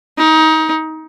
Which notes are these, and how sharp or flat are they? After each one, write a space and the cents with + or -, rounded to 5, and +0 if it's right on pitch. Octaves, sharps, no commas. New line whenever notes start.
D#4 +25